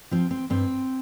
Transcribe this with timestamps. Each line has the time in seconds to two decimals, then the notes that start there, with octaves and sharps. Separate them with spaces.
0.11 F3 C4
0.31 C4
0.50 G2 C4